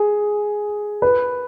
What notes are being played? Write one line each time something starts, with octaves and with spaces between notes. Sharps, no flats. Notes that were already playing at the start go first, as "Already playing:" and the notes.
Already playing: G#4
B4